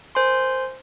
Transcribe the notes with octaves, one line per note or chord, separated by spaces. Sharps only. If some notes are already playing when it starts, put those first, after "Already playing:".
A#4 C5 G#5 C6